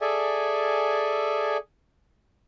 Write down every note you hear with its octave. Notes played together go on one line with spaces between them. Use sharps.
G#4 A4 D5 E5 G#5